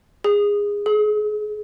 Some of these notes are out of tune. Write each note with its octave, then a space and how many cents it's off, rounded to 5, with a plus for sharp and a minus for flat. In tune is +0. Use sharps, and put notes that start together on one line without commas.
G#4 -20
G#4 +30